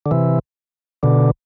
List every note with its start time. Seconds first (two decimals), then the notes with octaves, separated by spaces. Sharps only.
0.06 D3
0.11 C3 E3
1.03 B2 D3